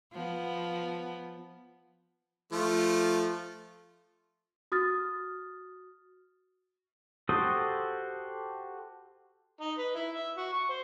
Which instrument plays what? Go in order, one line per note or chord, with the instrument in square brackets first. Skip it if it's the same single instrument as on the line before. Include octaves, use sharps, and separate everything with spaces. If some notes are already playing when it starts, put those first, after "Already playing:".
[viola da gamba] F3 B3
[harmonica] F3 A3 F4
[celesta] F#4 D#6 F6 A6
[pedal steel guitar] F#4 G4 A4 C5 D#6
[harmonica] D#4
B4
E4
E5
F#4
C#6
C5